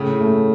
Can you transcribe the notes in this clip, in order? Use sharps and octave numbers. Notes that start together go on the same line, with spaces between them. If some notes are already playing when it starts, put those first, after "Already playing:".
Already playing: A2 C#3 C#4
A3